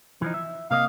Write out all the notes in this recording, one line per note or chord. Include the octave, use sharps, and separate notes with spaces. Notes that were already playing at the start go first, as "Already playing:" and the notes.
E3 F3 D#4
E5
C3 A#3 D#5 F5